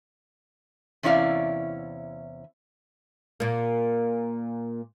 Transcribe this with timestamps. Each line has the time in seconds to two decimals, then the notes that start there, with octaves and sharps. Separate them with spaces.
1.03 E2 C3 C#4 E4 D5 F5
3.40 A#2 A#3